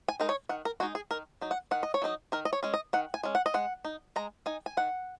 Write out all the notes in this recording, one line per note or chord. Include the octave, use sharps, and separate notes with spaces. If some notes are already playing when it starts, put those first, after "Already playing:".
G#5
G#3 D#4 A#4
C#5
D#3 F#5
A#4
G#3 D#4 F#4
G#4
D#3 A#4
F#3 D#4
F#5
D#3 F#5
D#5
C#5
F#3 D#4 D#5
D#3 A#4
D#5
C#5
G#3 C#4
D#5
D#3 F#5
G#5
G#3 C#4
F#5
D#5
G#3 F#5
D#4
G#3 A#5
D#4 G#5
G#5
D#3 F#5